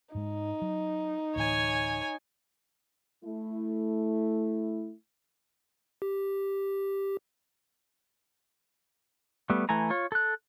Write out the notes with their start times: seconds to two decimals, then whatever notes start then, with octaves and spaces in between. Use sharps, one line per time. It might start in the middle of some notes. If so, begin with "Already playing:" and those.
0.15 G#2 G#3 D#4
0.62 F#3
1.36 D2 A2 E3 C#5 G#5
3.24 A3 E4
6.02 G4
9.50 G3 A3 B3
9.69 E3 A3 G#5 A#5
9.90 F4 C#5
10.12 A4 F#6